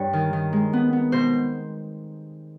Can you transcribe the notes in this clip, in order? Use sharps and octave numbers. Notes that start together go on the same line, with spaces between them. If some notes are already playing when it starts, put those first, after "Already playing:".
Already playing: G2 C#5
D#3
D#3
G#3
B3
B3
B2 C5